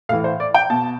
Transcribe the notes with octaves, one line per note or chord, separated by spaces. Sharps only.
A2 E3 F5
C5
D5
G5
B2 A5